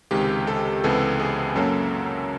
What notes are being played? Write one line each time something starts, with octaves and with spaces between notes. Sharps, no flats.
C#2 C3 D#3 G#3 G4
A4
C#2 C3 E3 G#3 B3 A4
G#4
F#2 C#3 F#3 A#3 A4